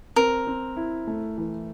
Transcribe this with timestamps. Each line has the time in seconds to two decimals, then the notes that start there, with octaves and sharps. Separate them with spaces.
0.16 C4 A#4
0.47 C4
0.77 E4
1.07 A3
1.38 E3